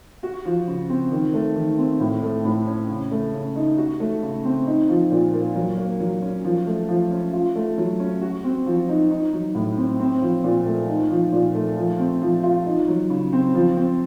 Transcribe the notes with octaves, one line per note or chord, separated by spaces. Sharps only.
F#4
F3
C#3
C4
D#3
A3
D#3
C4
A2
A3
A2
C#4
C#3
A3
C#3
D#4
F#4
A3
C#3
C4
D#4
F3
A#2
A#3
F#3
A#3
F#3
C#4
F3
A3
F3
C#4
F4
A3
F#3
C#4
F#4
C4
F3
D#4
D#4
F#3
A2
C4
C4
F3
A#2
A3
D#4
F3
A#2
A3
F3
C4
F3
F4
D#4
F#3
C#3
C4
F3
C4